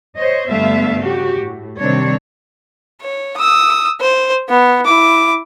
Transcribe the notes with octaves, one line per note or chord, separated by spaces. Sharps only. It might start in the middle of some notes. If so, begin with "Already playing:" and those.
C5 C#5 D#5
G2 D3 A3 B3 E5 F5
C#3 F#4 G4
A2
C3 D#3 G3 C4 D4 C#5
C#5
D#6 E6
C5
B3
E4 D6